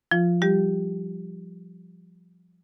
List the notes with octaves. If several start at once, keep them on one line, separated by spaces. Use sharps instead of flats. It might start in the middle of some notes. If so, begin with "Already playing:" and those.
F3 F4
G3 G4